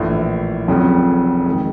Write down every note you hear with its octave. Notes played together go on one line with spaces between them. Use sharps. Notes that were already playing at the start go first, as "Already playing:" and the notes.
Already playing: A#1 A2 E3
F1 F2 C#3 F#3
D#3 G#3